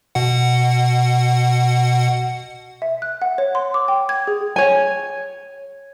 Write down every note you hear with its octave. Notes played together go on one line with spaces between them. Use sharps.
B2 F#5
E5
F#6
F#5
C#5
C6
D6
G5
G#6
G#4
C#5 G#5